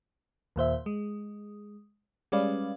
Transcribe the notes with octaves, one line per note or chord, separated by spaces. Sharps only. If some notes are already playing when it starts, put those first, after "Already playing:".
D#2 A#2 C5 E5
G#3
G3 G#3 C#4 B4 D5 F5